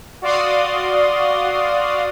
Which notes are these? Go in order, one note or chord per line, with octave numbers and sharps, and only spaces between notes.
F#4 D5 F5 C6 D#6